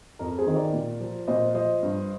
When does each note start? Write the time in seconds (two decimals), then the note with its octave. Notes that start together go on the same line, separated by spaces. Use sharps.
0.19 F2 A#4
0.38 G#4 C5
0.47 D#3
0.56 A#4 D5
0.73 A#2
1.01 F3
1.27 A#2 C5 D#5
1.54 F3 C5 D#5
1.82 G2